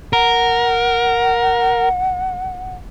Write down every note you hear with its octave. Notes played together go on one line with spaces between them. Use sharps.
A#4 F#5